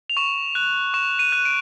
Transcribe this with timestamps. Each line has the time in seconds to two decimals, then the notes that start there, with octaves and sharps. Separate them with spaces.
0.10 F7
0.17 C#6 E7
0.55 F#6
0.94 C#6 E7
1.19 D#7
1.32 F#6
1.45 D7